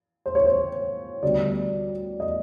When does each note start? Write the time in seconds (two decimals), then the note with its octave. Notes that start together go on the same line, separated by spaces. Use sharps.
0.26 C5
0.35 C#5
0.45 C5
1.23 D2 D3 G3 B3 D5
2.20 D#5